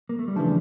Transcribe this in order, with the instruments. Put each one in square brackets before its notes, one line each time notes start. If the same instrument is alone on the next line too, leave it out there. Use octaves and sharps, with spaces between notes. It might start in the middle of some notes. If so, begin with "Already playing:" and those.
[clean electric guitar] A#3
A3
G3
[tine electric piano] C#3 E3 A3 D4 [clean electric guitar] F3